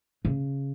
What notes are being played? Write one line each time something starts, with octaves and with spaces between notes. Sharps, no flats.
C#3